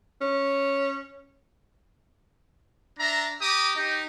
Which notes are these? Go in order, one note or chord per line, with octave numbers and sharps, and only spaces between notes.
C#4
D4 E5 A#5
G4 A#5 D6 D#6
D#4 G4